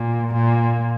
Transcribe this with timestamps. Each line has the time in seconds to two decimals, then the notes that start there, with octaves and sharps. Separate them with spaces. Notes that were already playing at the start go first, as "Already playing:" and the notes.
Already playing: A#2
0.34 A#2